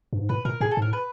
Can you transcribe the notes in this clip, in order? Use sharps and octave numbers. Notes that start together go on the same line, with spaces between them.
G2
G#2
A2 B4
A#2 A#4
A2 G#4
A4
G#2
A2 A#4
B4